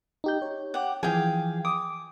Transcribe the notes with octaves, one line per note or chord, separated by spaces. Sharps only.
D#4 G4 G6
C#5
G4 F#5
E3 F3 G#4 F5 G5
D6 D#6